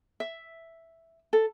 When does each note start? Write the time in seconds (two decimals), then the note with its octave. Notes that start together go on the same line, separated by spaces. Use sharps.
0.20 E5
1.33 A4